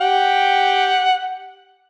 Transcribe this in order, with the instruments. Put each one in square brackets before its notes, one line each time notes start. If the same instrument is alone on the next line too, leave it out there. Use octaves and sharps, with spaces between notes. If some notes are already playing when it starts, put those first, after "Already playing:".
[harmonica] G4 F#5 G5